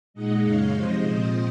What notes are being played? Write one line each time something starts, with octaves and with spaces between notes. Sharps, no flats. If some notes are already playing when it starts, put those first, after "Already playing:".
A#2 G#3 D#4 D#5 F#5
F#2 C#3 G#3 D#4 C#5 F5
C3 F3 G#3 C5 D#5
A#2 F3 C4